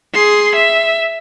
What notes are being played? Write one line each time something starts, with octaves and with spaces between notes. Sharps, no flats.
G#4 C6
E5